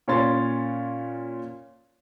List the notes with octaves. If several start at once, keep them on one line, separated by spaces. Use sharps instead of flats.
A#2 C#4 C#5 C6 A6